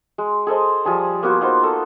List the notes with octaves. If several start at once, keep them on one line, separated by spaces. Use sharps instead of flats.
G#3
G#4 A4 C5 D#5
F3 G3 G#4 A5
A#3 B3 F4 F#4
A#3 B3 D#4 C5
A4